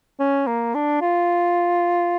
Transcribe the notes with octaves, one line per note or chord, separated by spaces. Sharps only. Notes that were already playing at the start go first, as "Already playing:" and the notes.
C#4
A#3
D4
F4